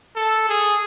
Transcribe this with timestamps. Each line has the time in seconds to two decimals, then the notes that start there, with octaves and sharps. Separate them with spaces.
0.16 A4
0.48 G#4